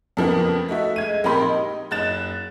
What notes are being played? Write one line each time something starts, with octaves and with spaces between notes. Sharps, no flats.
F2 C#3 F3 A#3 B3
A3 D#4 F#4 E5
G#3 G#6 D#7
A#1 C4 G4 A#4 B5 C6
D#4
F#1 D#4 F#6 A6 E7